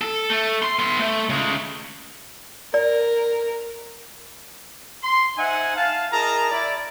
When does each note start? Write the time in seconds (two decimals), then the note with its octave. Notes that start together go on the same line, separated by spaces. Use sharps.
0.01 A4
0.30 A3
0.63 C6
0.79 B3 C6
0.99 A3
1.30 C#3 G#3
2.74 A#4 D5
5.03 C6
5.38 D#4 C5 E5 F#5 G#5
5.76 F5 A5
6.12 E4 G#4 A#4 D#5 A5 A#5
6.51 E4 D5